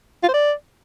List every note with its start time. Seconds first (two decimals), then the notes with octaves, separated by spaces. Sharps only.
0.23 F4
0.29 C5
0.34 D5